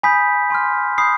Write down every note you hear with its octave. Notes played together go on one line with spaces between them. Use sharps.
G#5 B5 D#6 G6 B6
G#5 C6 F6
B5 D#6 G6 C7